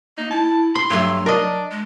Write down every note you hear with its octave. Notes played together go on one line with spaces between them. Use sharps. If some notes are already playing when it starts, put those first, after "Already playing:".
A#3 D#4
E4 A5
B5 C6
G2 F#3 A3
D4 A#4 D#5
G#3